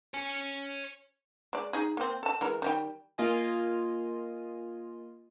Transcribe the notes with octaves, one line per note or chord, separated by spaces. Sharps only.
C#5 G#5
G#3 D5
D#4 G#4
A#3 C4
A4 A5
E3 G#3 A#4
D#3 G3 G5
A#3 F4 D#5 G#5